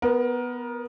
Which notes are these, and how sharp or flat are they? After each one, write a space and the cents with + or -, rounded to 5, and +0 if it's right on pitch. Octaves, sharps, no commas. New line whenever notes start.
B3 +0 A#4 +20